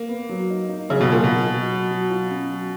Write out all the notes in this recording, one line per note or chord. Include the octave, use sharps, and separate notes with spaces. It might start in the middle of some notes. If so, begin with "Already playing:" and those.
Already playing: A#3
B3
F#3
D#4
D#4
C#3 F#3
B2
A#2 F#3
B2
D#4
F#3
F#3
F#3
F4
C#4
F#3